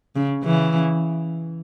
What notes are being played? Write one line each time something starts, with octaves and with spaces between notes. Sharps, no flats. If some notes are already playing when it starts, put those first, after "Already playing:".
C#3
C#3 E3